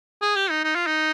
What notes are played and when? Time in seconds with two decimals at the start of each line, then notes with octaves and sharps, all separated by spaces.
0.22 G#4
0.36 G4
0.50 D#4
0.64 D#4
0.75 F4
0.87 D#4